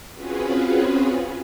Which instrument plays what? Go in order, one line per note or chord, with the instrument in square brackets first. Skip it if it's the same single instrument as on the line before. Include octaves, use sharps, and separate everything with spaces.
[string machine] C4 C#4 F4 F#4 G#4 B4